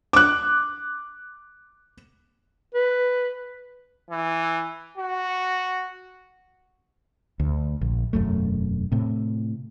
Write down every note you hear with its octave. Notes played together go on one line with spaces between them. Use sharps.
D6 F#6
B4
E3
F#4
D2
A#1
E1 F#2 A3
A2 C3